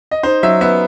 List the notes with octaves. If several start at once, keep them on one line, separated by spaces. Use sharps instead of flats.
D#5
D#4 C5
F#3 E5
B3 E5